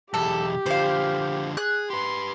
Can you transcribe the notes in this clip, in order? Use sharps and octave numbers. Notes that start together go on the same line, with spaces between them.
B1 E2 G4 A4
D3 F3 C5 F5
G#4 F#6
G4 B4 C6